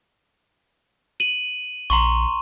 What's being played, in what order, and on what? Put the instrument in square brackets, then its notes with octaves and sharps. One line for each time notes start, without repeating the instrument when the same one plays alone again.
[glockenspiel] D#7 F#7
[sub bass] A#1 [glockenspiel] A#5 C6 C#6